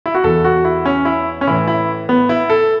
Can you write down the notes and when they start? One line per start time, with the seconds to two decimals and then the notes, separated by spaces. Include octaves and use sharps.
0.06 E4
0.14 F#4
0.24 E2 E3 A4
0.45 F#4
0.65 E4
0.86 C#4
1.05 E4
1.41 C#4
1.47 A2 E3 E4
1.67 E4
2.09 B3
2.29 E4
2.50 A4